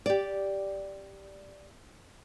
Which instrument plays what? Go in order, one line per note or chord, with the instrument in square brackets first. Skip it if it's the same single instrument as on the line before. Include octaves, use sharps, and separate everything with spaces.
[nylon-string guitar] G4 D5